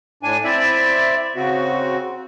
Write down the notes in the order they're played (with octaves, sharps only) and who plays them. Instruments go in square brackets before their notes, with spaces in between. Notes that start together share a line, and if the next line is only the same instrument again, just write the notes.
[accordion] A2 D4 G#5
C4 E4 D5 E5
C#3 C4 F#4